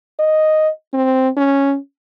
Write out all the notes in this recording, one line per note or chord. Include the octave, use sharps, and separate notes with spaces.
D#5
C4
C#4